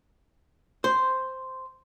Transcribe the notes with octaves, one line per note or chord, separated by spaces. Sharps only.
C5